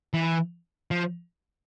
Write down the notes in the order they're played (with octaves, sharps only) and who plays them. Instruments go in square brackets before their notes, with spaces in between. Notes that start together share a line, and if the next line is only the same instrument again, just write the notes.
[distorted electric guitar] E3
F3